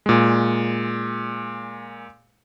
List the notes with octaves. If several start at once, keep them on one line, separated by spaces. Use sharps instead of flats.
A#2 G#3